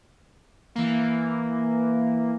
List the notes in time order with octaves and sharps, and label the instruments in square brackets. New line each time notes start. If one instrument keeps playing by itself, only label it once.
[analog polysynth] E3 A#3